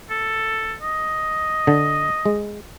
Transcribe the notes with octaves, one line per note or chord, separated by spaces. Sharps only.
A4
D#5
D3
G#3